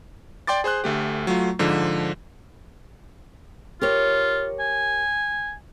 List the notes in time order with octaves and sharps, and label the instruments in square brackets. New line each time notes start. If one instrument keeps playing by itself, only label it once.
[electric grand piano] D5 G5 C6 D6 A6
G#4 C5 C6 F#6
D2 A3 G4
F#3 A3 F4
G#2 D3 F3
[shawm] F4 [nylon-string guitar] G4 A#4 C#5
[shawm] G#5